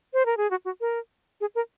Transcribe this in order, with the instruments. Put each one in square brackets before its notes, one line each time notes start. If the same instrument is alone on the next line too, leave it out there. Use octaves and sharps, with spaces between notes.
[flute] C5
A#4
G#4
F#4
F#4
A#4
G#4
A#4